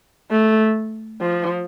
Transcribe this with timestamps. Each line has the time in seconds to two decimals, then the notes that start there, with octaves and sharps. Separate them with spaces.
0.31 A3
1.21 F3